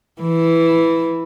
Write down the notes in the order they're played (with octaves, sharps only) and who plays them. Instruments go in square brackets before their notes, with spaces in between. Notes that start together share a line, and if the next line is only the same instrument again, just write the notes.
[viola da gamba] E3